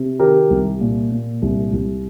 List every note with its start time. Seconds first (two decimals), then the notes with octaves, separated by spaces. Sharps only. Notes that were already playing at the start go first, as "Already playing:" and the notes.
Already playing: C3
0.20 D#3 G4 A#4
0.50 C2
0.81 A#2
1.12 A#2
1.42 C2
1.73 C2